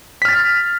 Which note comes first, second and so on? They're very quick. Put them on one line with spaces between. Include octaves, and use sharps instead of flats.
B6 F6 A6